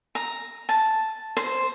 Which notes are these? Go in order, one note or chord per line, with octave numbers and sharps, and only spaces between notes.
A#5
A5
C5